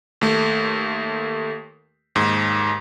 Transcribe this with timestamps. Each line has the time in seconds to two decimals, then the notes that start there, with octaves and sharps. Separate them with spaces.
0.21 D#2 A3
2.15 D#2 G#2